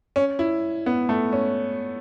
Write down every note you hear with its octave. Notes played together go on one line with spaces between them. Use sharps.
C#4
E4
B3
A3
C#4